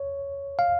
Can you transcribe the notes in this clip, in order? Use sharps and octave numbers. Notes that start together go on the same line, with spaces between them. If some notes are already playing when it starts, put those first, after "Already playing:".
Already playing: C#5
F5